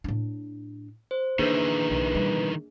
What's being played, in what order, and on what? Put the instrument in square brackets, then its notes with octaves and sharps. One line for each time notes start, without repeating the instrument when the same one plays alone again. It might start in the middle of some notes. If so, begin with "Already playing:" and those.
[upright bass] A2 D4
[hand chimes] C5
[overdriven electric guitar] D#3 E3 [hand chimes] A#3 D4 G#4 [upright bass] B3 [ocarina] B4
[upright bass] B1
B2 G3